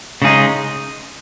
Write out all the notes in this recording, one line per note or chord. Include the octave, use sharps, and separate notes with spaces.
C#3 G#3 D#4 G#4